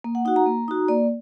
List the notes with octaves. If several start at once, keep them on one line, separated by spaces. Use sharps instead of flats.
A#3
F#5
D#4 F#4 F#5
A#5
A#3
D#4 F#4
A#3 D5